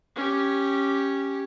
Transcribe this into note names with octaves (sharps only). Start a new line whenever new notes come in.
C#4 G4